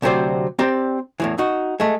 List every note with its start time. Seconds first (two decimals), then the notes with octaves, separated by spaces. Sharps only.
0.02 D2 C3 F#3 C4 C5 D5
0.59 C4 G4 D5 A#5
1.20 E2 A2 E3
1.38 D#4 F#4
1.80 G#3 A3